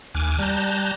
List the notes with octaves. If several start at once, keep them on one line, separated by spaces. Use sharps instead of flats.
D#2 G#5 D6 F6 F#6
G3 A5 A#5 F#6 G6